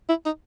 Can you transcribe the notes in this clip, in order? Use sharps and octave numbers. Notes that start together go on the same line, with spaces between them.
E4
D#4